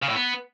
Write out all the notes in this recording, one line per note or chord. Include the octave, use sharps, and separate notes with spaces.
C#3
A2
B3